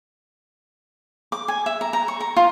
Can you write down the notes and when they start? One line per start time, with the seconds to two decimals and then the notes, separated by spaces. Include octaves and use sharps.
1.32 D6
1.48 G#5
1.66 E5
1.81 A#5
1.93 A#5
2.08 C#6
2.21 A#5
2.37 F4